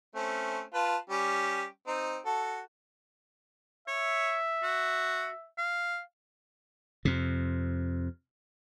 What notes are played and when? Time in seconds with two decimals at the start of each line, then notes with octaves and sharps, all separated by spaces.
0.15 A3 C4 C#4
0.74 F4 B4 A5
1.10 G3 C#4 G4
1.87 C4 D#4
2.26 F#4 A4
3.88 C#5 E5
4.63 F#4
5.58 F5
7.05 F2 C3